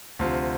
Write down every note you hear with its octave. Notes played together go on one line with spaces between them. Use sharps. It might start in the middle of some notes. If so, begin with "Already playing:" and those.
D2 C3 F3 C4 F4